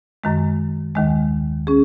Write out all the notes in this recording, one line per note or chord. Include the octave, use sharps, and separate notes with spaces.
F#2 D#3 G#3
D#2 D#3 G#3
C#4 G#4